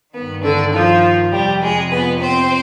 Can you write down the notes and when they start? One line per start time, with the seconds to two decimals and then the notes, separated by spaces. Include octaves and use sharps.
0.14 G2 D#3 B3
0.43 D3 D4
0.74 F3 F4
1.32 F2 C3 F3 G3 G4
1.62 G#3 G#4
1.91 B3 B4
2.21 C4 C5